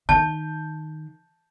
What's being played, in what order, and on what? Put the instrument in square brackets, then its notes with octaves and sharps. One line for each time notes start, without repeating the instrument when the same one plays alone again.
[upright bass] D#3 [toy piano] A5 [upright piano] G6